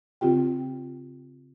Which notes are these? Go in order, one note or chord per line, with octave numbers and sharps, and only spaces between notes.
C#3 C4 F4 G4 G5